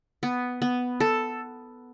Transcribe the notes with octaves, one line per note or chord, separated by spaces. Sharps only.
B3
B3
A4